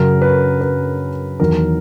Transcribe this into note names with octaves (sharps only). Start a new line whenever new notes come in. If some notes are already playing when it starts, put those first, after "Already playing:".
Already playing: F#2 C#3 F#3 A#4
B4
B4
E2 D#3 F#3 A#4